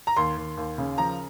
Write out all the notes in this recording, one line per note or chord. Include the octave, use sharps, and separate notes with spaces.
A#5
D#2 C6
D#2
D#2
C#3
F3 A#5